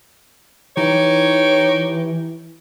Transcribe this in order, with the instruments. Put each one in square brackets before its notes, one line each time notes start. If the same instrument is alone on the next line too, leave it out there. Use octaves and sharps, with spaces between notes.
[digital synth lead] E3 [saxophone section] D#4 G4 C#5